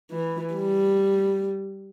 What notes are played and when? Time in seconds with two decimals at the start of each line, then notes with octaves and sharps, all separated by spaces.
0.11 E3
0.54 G3